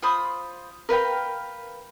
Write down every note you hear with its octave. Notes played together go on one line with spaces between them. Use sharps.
F4 C5 B5 D#6
A#4 B4 F5 G5